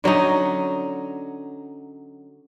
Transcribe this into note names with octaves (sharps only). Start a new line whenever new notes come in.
D3 F#3 C#4 D#4